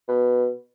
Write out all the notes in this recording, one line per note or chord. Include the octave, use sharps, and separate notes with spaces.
B2